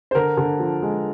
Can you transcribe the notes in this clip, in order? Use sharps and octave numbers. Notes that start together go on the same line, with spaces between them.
C5
D3 A#4
D3
F3
G#3